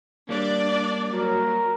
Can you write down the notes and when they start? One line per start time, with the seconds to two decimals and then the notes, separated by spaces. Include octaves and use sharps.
0.29 G3 A#3 D4 D5
1.12 F#3 A#4